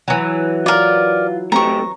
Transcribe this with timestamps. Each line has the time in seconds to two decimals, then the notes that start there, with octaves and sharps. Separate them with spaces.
0.08 E3 F#3
0.66 F4 A#4 D5
1.52 A3 C4 G4 A#5 C#6